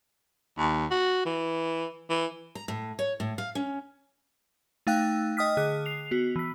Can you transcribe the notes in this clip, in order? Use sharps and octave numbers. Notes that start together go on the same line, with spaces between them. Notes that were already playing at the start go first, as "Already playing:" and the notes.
D#2
F#4
E3
E3
A#5
A2
C#5
A2
F5
C#4
A3 D#4 F5 G5 E6 F#6
D#5 G5 D#6 F6 B6
D3 G#4 F#6
C7 F7
B3 F#4
E3 B6